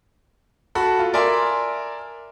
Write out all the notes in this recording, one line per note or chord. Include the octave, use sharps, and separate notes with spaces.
F#4 A4 B5
F4
A#4 D5 E5 G#5 C6